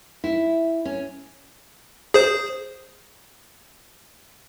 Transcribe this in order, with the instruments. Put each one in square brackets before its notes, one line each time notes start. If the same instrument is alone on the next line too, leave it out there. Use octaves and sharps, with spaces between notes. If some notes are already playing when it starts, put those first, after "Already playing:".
[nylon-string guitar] E4
C#4
[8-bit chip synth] G#4 C5